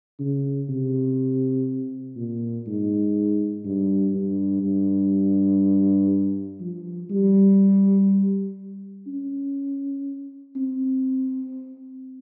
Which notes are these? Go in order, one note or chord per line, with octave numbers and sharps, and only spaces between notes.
C#3
C3
A#2
G#2
G2
G2
G2
F3
G3
C#4
C4